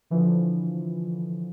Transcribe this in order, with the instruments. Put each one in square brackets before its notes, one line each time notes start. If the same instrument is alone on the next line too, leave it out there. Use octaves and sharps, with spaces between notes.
[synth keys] D3 E3 F3